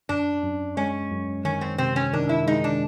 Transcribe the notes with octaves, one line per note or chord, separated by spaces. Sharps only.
F#2 D4
F#2
G#3 C#4
F#2
D#3 C#4
C4
C3 C4
C#4
D#3 D4
E4
G#3 D#4
D4